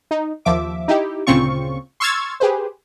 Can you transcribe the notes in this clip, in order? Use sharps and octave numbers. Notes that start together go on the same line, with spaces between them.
D#4
D#2 F3 E5 D6
D#4 E4 G4
D2 A#2 C#3 C4 F4 C#6
C6 C#6 E6 F6 G#6 A6
G4 G#4 B4 C5